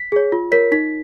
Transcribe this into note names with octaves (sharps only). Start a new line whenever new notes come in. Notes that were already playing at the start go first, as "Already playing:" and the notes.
Already playing: B6
G#4 C#5
F4
A#4 C#5 B6
D#4 B6